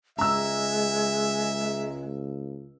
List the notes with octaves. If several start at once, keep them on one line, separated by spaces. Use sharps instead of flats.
C#2 G#3 E5 A#5 E6